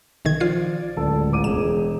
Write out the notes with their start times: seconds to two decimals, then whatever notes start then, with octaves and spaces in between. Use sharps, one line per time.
0.25 B1 D#3 G#6
0.40 F3 F4 D5 C7
0.97 D1 C#2 A4
1.32 A1 D6 D#7
1.44 E1 G#4 E7